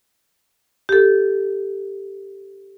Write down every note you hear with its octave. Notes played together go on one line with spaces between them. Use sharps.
G4 A4